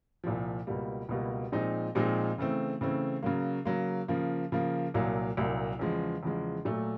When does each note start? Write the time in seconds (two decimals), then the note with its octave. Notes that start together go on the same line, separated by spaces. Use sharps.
0.24 C2 A#2 F3
0.67 C#2 B2 G3 A#3
1.09 C#2 B2 G3 A#3
1.52 A#2 F3 G#3 C4 D#4
1.95 A#2 F3 G#3 C4 D#4
2.38 C#3 E3 A3 C4
2.81 C#3 E3 A3 C4
3.23 C#3 F#3 A#3
3.65 C#3 F#3 A#3
4.08 C#3 F3 A#3
4.52 C#3 F3 A#3
4.94 C2 A#2 F#3 A#3
5.37 C2 A#2 F#3 A#3
5.79 E2 C#3 F3 G#3
6.23 E2 C#3 F3 G#3
6.65 A#2 F#3 A3